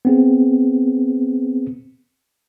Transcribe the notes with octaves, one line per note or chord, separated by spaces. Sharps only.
B3 C4 G#4